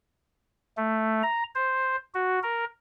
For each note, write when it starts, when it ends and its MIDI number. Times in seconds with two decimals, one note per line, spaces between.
0.77 1.22 57
1.23 1.43 82
1.55 1.96 72
2.14 2.39 66
2.43 2.65 70